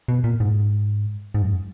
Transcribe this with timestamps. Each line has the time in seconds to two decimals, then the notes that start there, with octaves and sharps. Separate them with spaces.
0.08 B2
0.24 A#2
0.40 G#2
1.34 G#2
1.42 F#2